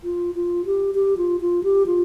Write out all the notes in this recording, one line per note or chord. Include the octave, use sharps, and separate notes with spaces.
F4
F4
G4
G4
F4
F4
G4
F4